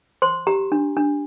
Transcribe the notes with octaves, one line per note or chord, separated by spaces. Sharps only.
C5 C6
G4 A#5
D4
D4